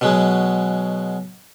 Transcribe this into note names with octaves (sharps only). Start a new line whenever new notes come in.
B2 F#3 G#3